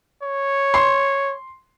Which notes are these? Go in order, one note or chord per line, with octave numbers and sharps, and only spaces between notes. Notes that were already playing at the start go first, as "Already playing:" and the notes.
C#5
C6